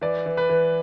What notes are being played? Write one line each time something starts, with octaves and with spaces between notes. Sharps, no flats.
E3 D5
E3
B4
E3